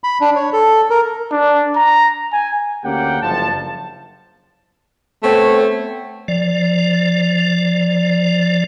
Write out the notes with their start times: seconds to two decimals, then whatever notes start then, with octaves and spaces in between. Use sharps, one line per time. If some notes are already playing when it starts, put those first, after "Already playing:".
0.04 B5
0.21 D4
0.35 C#5
0.53 A4
0.90 A#4
1.31 D4
1.76 A#5
2.33 G#5
2.84 D2 A#3 C#4 G4 F#5 G5
3.22 F#1 G2 C#3 F3 A5
5.23 A3 B3 C4 C#5
6.28 F3 D5